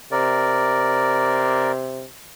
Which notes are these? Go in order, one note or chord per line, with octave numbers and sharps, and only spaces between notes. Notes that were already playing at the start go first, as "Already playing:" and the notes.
C3 A#4 D5